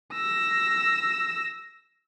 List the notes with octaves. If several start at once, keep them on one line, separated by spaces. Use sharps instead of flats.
E6 A#6